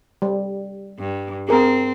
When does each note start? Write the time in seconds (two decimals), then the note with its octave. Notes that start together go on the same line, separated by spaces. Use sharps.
0.22 G3
0.99 G2
1.49 C4 G#4 A#4